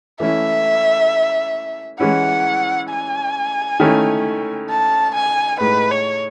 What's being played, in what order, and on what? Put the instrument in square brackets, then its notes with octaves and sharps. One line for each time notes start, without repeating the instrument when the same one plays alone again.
[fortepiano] E3 A3 C#4 E4 [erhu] E5
[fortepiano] E3 G#3 C#4 E4 [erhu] F#5
[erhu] G#5
[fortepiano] D#3 A3 C#4 E4
[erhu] A5
G#5
[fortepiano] A2 G#3 D#4 [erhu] B4
[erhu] C#5